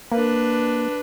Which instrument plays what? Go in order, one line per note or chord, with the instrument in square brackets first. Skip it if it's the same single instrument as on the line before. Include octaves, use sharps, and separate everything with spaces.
[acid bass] A#3 [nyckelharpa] D4 B4